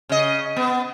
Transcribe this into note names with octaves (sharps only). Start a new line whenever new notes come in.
C#3 D#5
B3